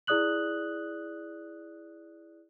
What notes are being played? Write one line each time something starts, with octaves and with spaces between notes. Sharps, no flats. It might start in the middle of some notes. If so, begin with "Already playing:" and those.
E4 G#4 D5 D#6 F#6 F#7